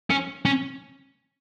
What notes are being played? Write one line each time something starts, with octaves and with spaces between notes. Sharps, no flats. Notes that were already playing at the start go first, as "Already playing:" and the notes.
C#4
C#4